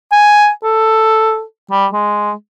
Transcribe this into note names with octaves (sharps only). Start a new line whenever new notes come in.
G#5
A4
G3
G#3